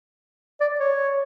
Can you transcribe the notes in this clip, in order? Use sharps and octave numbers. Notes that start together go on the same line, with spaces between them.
D5
C#5